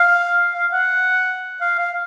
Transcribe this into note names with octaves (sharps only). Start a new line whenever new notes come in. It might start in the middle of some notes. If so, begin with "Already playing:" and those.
Already playing: F5
F5
F#5
F5
F5